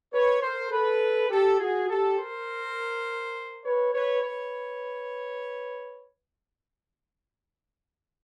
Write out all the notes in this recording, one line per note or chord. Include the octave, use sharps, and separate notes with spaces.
B4 C#5
A#4 C5
A4 B4
G4 A4
F#4 G#4
G4 A4
A#4 C5
B4 C#5
B4 C#5
B4 C#5